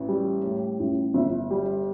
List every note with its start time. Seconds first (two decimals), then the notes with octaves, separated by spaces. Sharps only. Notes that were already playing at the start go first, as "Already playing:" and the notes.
Already playing: A1 B4
0.08 G3
0.43 A2
0.80 A1
1.14 G1 E5
1.51 G3